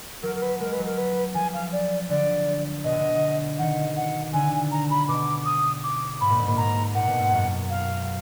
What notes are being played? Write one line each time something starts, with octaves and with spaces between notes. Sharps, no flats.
F#3 A#4
A#4
B4
G#3 A#4
B4
F#3
A#4
B4
F3 G#5
F5
D5
D3 D5
B2 D#5
D3
B2
D#3 F#5
F#5
D3 G#5
A#5
B5
B2 D6
D#6
D6
G#2 B5
A#2
G#2
A#2
G#2 A#5
A#2 F#5
B2
G#2
F#2
F5